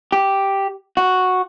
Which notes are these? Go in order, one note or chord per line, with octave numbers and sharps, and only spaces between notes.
G4
F#4